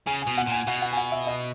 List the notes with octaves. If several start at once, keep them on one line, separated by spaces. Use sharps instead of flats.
C#3 G#5
G#5
B2
F#5
A#2 G#5
B2 F#5
F#5
G#5
F#5
E5
D#5